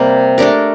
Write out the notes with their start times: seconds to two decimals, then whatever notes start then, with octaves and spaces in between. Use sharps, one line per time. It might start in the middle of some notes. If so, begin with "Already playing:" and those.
Already playing: C3 G3 A#3
0.38 A3 D4 G4 A#4